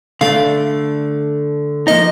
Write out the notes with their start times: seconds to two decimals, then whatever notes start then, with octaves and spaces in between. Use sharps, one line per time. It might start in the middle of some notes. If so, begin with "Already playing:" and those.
0.21 D3 A3 D4 F5
1.87 F3 A#3 D#4 D#5